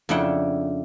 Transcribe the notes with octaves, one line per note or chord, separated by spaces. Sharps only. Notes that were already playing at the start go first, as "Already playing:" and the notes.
F2 C#3 D4 E4 F#5 G5